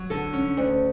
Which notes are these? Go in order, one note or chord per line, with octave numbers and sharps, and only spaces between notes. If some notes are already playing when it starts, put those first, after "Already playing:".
Already playing: F#3
D3 A4
C#4
D2